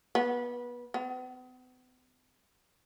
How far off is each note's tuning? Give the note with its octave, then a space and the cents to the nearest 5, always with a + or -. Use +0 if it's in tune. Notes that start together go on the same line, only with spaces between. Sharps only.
B3 -25
B3 +45